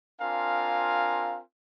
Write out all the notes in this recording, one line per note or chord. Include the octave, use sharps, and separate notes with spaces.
C4 D4 F4 A#4 F5 G#5